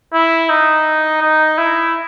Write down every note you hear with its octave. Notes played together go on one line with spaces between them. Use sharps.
E4
D#4
D#4
E4